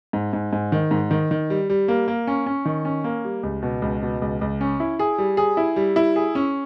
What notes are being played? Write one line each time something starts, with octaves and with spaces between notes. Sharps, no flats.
G#2
G#2
G#2
D#3
G#2
D#3
D#3
G3
G3
A#3
A#3
C#4
C#4
D#3
C#4
A#3
G3
C#2
B2
C#2
B2
C#2
C#2
C#4
E4
G#4
G3
G#4
E4
G3
E4
G#4
C#4